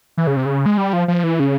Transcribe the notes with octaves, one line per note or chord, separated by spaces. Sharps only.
E3
C#3
C3
C#3
G#3
G3
F3
F3
E3
C#3